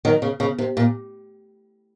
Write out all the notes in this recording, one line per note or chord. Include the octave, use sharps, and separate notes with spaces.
D#3 F#3
C#3
C#3
C3
A#2